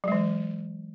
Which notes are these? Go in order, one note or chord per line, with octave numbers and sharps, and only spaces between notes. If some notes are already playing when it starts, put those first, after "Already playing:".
E3 F#3 G#3